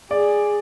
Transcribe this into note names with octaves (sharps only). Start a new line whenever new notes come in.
G#4 D5